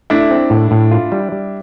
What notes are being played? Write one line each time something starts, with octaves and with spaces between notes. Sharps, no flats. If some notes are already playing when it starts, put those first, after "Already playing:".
A3 D4 E4
C4
A2
A2
F4
G3
G3